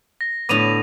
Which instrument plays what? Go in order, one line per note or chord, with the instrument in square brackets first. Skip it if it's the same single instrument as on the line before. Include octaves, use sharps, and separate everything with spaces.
[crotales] A#6
[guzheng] A2 D3 B3 [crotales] D6 D#7 F7